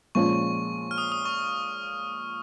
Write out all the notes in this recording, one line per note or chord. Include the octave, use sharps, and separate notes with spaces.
A#2 F3 G#3 C#4 F4 C#6
F6
D#6
D#6
C#6